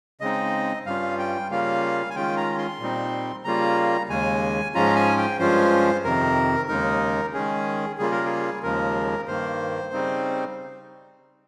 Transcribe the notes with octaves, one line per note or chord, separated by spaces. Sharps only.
C#3 G#3 C4 D#4 D#5
G2 G3 C#4 F4 F5
G5
C#3 G3 A#3 C#4 F4 F5
G#5
D#3 G#3 C#4 F4 G5
A#5
C6
A#2 G3 C4 D#4
C#3 G3 A#3 F4 A#5
D#2 C#3 G#3 G#5
G#2 F3 G#3 C#4 F4 A#5
G#5
G5
G2 F3 G#3 C#4 F4 C5
F2 C3 D#3 A#4
D#2 C#3 G#3 D#4 A#4
D#3 G#3 C#4 G#4
C#3 G3 A#3 F4 G#4
A#4
G#4
D#2 C#3 F3 G#3 A#4
G2 D#3 A#3 C5
C#3 G3 C4 D#4